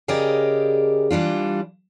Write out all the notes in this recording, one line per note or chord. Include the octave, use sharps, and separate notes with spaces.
C#3 G4 G#4 A#4 D5 D#5
E3 G3 D4 F4